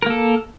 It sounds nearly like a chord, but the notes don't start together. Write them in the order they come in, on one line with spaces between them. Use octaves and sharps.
A#4 A#3 A4